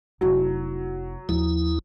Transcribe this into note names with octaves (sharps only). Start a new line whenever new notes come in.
F1 F#3 E4
D#2 F3 E4